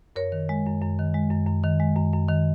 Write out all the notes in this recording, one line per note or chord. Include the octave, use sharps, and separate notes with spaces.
F#2 A#4 C#5
D#3
G#3
F#2
F#2
D#3
G#3
F#2
F#2
D#3
G#3
F#2
F#2
D#3